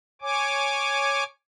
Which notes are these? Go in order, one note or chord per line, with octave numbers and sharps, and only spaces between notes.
C#5 G#5 D6